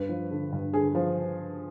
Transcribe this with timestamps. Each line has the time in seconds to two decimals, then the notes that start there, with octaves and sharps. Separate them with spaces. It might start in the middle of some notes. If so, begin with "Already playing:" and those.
Already playing: G2 B4
0.09 F3
0.31 D3
0.53 G2
0.73 D3 G#4
0.95 F3